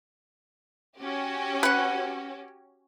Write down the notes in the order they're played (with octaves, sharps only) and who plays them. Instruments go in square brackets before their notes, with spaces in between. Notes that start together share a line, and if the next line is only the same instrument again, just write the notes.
[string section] C#4 F#4 G4
[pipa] B4 F#5